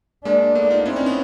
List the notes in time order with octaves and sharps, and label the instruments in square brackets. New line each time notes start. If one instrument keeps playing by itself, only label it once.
[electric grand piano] G#3 A#3 [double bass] D4
[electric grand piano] A3 B3
D#4 F4
[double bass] C4 [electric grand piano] D4 E4
[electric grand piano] C#4 D#4
B3 C#4